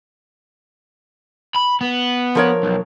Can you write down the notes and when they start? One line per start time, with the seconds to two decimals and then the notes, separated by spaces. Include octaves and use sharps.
1.56 B5
1.81 B3
2.35 F3 A#4 C#5
2.63 B1